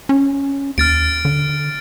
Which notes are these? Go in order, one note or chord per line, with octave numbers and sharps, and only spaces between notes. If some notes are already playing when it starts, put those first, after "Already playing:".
C#4
D#2 F6 A6 D7
D3